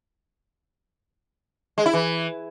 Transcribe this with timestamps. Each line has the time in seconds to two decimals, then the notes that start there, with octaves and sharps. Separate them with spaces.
1.78 G#3
1.86 E4
1.94 E3